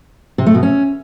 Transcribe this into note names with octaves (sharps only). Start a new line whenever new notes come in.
C3
A3
B2
C#4